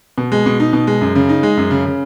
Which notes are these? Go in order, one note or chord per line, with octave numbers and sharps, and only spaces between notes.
B2
G#3
B2
D#4
B2
G#3
F#2
C#3
D#4
G#3
F#2
C#3
C#3